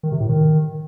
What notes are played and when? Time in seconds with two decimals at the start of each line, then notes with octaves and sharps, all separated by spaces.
0.03 D#3
0.12 C3
0.20 A2
0.29 D#3